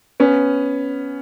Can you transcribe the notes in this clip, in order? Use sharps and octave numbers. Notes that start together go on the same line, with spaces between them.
B3 C#4